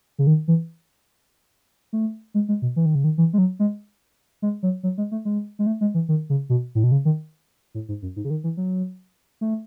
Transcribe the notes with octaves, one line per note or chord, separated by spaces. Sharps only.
C#3
D#3
E3
A3
G#3
G#3
B2
E3
D#3
C#3
D#3
E3
G#3
F#3
G#3
G#3
F#3
F#3
G#3
A3
G#3
G#3
A3
G#3
E3
D#3
C#3
B2
A2
B2
C#3
D#3
A2
G#2
F#2
G#2
C#3
D#3
E3
F#3
A3